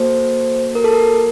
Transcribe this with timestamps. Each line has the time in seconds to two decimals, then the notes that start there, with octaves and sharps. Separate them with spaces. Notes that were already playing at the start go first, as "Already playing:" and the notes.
Already playing: A#3 F#4 A4 C5
0.75 A#4
0.84 A4
0.93 A#4